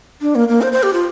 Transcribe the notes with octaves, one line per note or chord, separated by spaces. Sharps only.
D4
A#3
A#3
C5
C5
G4
F4